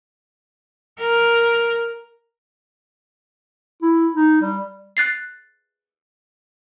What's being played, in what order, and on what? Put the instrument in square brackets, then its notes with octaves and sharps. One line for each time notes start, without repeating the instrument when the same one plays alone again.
[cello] A#4
[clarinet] E4
D#4
G3
[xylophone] F#6 A6 C7